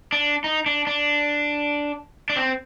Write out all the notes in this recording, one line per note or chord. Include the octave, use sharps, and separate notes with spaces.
D4
D#4
D4
D4
D4
C4